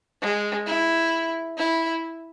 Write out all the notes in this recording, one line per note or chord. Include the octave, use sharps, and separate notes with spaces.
G#3
E4
E4